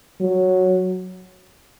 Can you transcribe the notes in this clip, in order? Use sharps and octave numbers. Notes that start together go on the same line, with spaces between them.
F#3